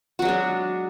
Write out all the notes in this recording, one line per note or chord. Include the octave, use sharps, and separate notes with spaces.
F#3 G#3 D4 F#4